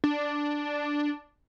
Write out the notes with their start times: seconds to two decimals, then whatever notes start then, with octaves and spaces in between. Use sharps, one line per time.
0.04 D4